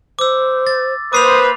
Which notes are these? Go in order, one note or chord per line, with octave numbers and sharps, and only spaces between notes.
C5 D6 E6
A6
A#3 B4 C5 D6 D#6 C7 F7